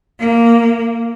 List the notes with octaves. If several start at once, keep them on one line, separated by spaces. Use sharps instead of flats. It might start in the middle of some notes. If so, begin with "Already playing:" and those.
A#3